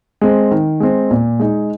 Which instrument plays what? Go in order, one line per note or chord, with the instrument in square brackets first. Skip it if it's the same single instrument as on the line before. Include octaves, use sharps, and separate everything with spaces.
[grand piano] G#3 C4
D#3
G#3 C4
A#2
G#3 D#4